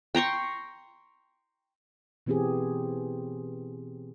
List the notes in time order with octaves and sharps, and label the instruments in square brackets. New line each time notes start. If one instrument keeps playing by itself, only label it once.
[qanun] G5 A#5 C6 C#6
[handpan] B2 E3 B3 C4 G4 G#4